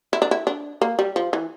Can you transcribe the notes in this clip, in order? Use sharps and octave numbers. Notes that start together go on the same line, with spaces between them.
E4
D4
E4
D4
A#3
G3
F3
E3